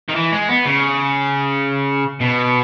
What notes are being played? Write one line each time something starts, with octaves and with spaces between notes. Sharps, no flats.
D#3
E3
G#3
B3
C#3
B2